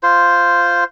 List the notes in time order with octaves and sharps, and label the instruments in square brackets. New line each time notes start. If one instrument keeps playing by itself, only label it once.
[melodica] F4 C5